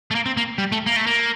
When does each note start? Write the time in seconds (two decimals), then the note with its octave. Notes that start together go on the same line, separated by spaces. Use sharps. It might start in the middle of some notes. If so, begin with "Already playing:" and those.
0.11 A3
0.15 A#3
0.26 C4
0.37 A#3
0.58 G3
0.72 A3
0.86 A#3
0.96 A3
1.07 A#3